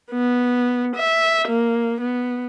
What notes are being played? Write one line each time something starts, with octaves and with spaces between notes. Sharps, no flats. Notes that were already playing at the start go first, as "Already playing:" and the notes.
B3
E5
A#3
B3